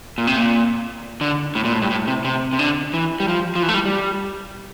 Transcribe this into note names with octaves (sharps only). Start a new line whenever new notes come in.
A#2
C3
A#2
D3
A2
A#2
A2
G2
A2
C3
C3
C3
D3
E3
G3
F3
F3
E3
A3
G3
G3